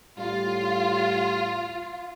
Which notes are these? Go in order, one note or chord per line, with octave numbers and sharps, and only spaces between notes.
A2 G3 F4